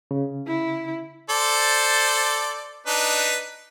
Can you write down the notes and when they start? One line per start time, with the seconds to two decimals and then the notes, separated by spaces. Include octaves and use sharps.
0.11 C#3
0.47 E4
1.30 A4 C5 D5
2.87 D4 D#4 B4